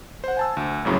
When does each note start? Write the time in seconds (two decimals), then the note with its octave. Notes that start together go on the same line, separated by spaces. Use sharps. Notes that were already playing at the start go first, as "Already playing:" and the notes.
0.24 C5 F#5
0.37 G#5 A5 E6
0.57 D2
0.85 G1 F#2 A2 C#3 F#3